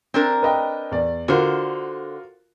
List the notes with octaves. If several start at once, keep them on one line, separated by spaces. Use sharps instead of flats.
C4 D4 A#4
B4 D#5 G5
E2 D5
D3 F4 F#4 A#4 C5